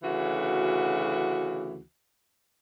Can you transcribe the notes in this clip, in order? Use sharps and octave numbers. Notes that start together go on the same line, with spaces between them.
D2 C#3 E3 F#4